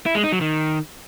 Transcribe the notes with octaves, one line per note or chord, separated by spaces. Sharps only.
E4
G#3
D#4
F#3
D#3